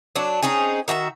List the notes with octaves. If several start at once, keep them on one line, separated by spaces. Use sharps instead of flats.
F#3 D4
C4 C#4 D#4 G#4
D#3 F#4 G#4 E5